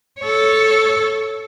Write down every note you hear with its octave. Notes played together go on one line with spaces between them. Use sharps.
A4 C#5